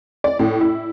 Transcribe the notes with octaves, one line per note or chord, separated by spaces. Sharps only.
D5
A2
E4